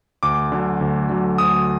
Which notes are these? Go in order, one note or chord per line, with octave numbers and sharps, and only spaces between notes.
D2 D6
D3 F#3
D2
D3 F#3
D2 D#6